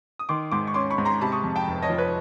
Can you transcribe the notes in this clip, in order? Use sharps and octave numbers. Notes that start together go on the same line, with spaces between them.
D#6
D#3 C6 D6
G#2 C6 D6
C#6
C#4 C6 D6
B5 C#6
G#2
A#5 C6
C3 A5 B5
C#6 D#6
F2
G5 A5
F1
C#5 D#5
F3
B4 C#5